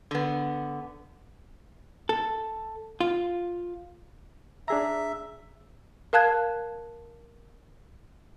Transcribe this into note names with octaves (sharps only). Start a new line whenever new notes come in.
D3 B3
A4
F4
D4 G#4 E5 A#5
A#4 F5 A5 F#6 G#6